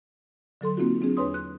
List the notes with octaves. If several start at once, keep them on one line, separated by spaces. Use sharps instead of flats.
D3 F#3 A4 C6
A#3 C4 D#4 F4 F#4
F#3 C4 D4 G#4
E2 D4 B4 C#5 C6 D#6
F#6